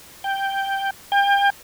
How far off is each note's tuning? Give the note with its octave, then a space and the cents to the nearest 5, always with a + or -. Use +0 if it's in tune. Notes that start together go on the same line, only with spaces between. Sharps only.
G5 +0
G5 +35